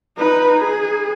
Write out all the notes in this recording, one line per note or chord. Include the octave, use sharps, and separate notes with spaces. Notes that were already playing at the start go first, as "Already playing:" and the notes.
D#4 B4
G#4